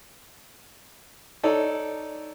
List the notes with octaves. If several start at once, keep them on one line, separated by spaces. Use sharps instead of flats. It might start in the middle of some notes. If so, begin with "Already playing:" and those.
D#4 A4 C#5 D5